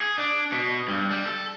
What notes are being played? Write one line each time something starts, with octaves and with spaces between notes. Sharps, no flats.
G#4
D4
B2
G2
G3
A4